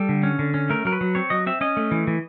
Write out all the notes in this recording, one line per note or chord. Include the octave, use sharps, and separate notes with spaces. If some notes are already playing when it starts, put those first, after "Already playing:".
Already playing: G3 A4
D3
C#4
D3
C#4
A3 A#4
F#3 A#4
B4
F#3
C4 C#5
F#3 D#5
C4 E5
C#4 D#5
A3
E3
E3